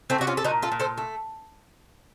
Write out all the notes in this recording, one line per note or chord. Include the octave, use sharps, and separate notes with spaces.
A3 C4
C3 F#4
C#4 F4
A4
A#2 D#4 F#4
F4 A4
A#2
A4 C5
A3